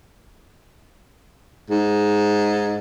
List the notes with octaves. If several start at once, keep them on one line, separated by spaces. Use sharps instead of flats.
G#2